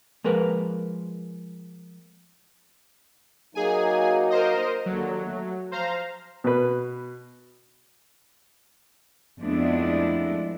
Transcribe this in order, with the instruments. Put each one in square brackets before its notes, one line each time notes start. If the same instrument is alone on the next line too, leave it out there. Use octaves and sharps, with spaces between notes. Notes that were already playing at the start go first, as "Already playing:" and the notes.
[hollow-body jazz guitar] F3 G#3 A#3 A#4 B4
[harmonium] F#3 A#3 D#4 [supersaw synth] G#4 G#5
[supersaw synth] A#4 C5 D#5
[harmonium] D#2 D3 [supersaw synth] F#3
[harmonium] A3
[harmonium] F3 [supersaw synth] C5 F5 A#5
[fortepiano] B2 B4
[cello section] F2 G#3 A3 B3 D4 E4